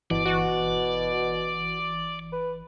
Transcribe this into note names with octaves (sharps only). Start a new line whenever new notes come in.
G1 B2 E3 D5
B2 F#4
B4